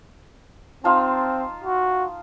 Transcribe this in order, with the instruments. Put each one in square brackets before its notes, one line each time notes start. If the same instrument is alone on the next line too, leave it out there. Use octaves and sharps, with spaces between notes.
[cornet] C4 [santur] D#4 F4 A5
[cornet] F#4